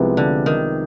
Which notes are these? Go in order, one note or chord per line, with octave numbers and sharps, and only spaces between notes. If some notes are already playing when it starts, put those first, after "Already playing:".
Already playing: C2 C3 F3 G#3 B3
D3
D#3